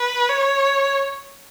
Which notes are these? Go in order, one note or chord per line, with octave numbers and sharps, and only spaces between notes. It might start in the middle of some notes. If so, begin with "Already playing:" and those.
Already playing: B4
C#5